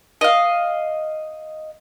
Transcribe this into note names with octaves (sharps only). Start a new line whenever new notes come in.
D#5 F5